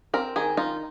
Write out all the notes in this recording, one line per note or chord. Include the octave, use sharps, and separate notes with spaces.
C4 A#4
D#3 G#4
D#4 F4